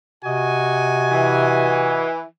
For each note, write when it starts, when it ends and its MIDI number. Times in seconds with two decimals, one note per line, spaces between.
0.24 2.06 48
0.24 2.09 66
0.24 2.09 75
0.24 2.09 80
1.10 2.24 52